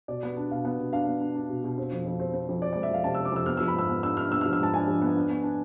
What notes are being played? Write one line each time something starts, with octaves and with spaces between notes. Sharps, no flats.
B2 D5
B3
D4
B2 F5
B3
B2
D4 F5
B3
D4
D4
B2
B2
C4
F2
F2
C4
C4
F2
C4 D5
G#3 D5
E5
F2 F5
C3 A5
C4 E6
D6
F2 E6
B3 F6
F3 E6
B5
G#2 E6
B3
D4 E6
D4 F6
B3 E6
F3 F6
E6
G#2 A5
D4 G#5
F3
B3
D4
B3
D4